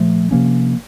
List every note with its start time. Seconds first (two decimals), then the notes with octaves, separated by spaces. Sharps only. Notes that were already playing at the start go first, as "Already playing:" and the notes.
Already playing: A#2 F3 A3
0.31 C3 F3 A#3 C#4